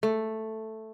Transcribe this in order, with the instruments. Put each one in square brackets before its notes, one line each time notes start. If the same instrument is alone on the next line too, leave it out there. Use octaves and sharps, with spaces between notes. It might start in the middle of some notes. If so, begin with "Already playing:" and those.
[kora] A3